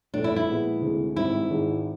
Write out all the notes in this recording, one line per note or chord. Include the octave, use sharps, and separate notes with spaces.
A#1 A2 E3 A3 D4
E4
E4
A#2 F3 G#3 B3
D2 C3 E3 G#3
A1 G#2 D#3 G3 C4 E4
G#1 G#2 D#3 G#3